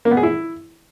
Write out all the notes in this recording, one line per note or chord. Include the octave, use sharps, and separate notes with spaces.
A#3
B3
G#4
E4